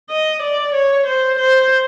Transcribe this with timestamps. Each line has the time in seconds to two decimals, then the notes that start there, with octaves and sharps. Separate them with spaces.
0.10 D#5
0.42 D5
0.74 C#5
1.06 C5
1.38 C5